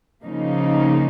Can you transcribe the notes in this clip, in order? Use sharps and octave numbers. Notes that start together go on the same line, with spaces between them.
C#3 F3 A#3 D#4